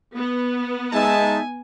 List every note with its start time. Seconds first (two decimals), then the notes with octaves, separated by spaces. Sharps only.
0.15 B3
0.93 G#3 D#4 E5 G#5 A5